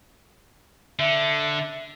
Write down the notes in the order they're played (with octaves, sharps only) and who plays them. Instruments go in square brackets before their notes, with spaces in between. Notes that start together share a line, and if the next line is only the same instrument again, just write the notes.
[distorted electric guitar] D3 [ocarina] E5